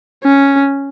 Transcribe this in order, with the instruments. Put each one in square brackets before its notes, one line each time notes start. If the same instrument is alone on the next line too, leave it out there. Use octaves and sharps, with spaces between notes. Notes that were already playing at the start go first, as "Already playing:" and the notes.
[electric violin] C#4